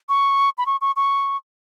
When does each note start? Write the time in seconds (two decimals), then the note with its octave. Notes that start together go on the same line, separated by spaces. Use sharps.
0.09 C#6
0.58 B5
0.66 C#6
0.81 C#6
0.96 C#6